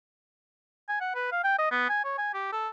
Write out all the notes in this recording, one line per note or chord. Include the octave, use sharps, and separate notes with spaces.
G#5
F#5
B4
F5
G5
D#5
B3
G#5
C#5
G#5
G4
A4